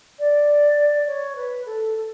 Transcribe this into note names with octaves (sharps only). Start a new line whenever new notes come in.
D5
C#5
B4
A4
A4